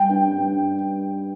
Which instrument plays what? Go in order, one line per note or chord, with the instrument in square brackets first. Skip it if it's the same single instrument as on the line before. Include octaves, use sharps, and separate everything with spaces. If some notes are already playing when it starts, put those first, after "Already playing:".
Already playing: [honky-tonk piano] G3 G5
G2
G2